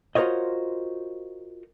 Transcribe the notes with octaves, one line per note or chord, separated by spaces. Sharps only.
F4 F#4 A#4 C5 C#5 D#5